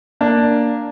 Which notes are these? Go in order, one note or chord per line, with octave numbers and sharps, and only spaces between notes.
A#3 D4